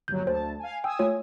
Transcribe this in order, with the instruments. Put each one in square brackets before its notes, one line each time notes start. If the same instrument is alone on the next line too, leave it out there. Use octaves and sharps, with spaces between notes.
[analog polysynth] G1 D#2 F#3 [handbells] G6
[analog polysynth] D2 A5 [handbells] C5
[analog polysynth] F5 G#5
[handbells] G5 [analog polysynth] G#5 D#6 E6
[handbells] A3 F4 C#5